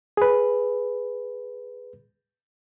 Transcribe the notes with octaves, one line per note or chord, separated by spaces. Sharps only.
G#4 B4